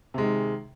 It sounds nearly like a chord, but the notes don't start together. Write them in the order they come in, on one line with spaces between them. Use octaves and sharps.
C3 G#3 D#3